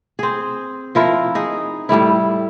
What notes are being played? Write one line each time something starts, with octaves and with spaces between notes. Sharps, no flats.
C4 G#4
F3 E4 A#4
D#4 G#4
A2 G3 A3 E4